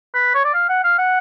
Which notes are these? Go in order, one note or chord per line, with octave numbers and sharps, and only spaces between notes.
B4
C#5
D5
F5
F#5
F5
F#5